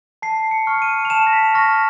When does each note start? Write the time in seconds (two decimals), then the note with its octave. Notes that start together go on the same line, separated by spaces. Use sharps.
0.22 A5 C7
0.51 C#7
0.67 C#6 F6
0.82 D#7
1.05 F7
1.10 A5 E7
1.27 A#6
1.33 B6
1.54 C#6 F6 A#6